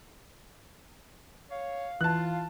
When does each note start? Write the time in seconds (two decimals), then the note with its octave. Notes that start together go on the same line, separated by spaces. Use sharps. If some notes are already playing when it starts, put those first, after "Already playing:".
1.51 C#5 F5
2.01 E3 F4 A5 F#6